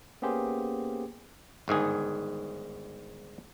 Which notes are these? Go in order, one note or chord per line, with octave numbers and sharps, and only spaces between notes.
A#3 B3 C#4 G4 G#4 C5
G1 G#2 D#3 G#4